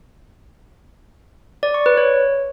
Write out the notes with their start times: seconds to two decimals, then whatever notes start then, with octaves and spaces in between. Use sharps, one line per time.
1.63 D5
1.74 C#6
1.86 B4
1.97 C#5